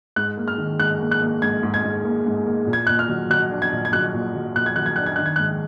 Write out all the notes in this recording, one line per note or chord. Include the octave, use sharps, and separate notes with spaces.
G#2 F#6
A#3
F6
D#3
G#2 F#6
A#3
F#6
A#3
G#2 G#6
G#2
G#6
G#2
A#3
G#2
A#3
A#2
G#6
A#2 F#6
F6
F#3
F#3 F#6
D4
G#6
A#2
G#6
F#3 F#6
A#2
F#3
A#2 F#6
G#6
F#3 F#6
G#6
D4 F#6
G#6
D#3 F#6
G#6
G#2 F#6